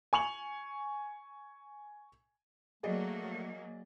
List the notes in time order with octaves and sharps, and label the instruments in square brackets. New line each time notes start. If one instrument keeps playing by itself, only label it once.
[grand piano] G#5 C#6 F7 F#7
[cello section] F#3 A#3 [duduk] A3 [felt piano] G#4 D5 D#5